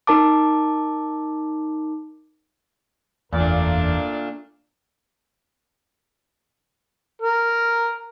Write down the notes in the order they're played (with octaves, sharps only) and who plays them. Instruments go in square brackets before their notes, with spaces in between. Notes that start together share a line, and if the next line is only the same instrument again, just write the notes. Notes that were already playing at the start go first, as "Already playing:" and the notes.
[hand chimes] D#4 A#4 A5 D6
[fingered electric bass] F#1 E2 [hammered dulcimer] A#2 [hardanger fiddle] A3 D4 [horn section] A#4 D5 F5
[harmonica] A#4